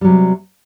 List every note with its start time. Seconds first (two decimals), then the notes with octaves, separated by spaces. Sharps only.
0.01 G3
0.04 F#3
0.07 C3